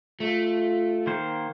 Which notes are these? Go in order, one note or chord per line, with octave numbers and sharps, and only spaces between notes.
A3 F4
D#3 A#3 C5